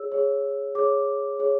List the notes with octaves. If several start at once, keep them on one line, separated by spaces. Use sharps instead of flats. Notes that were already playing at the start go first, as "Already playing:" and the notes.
Already playing: G#4 C#5 E6
G#4 C#5
G#4 C#5 D6
G#4 C#5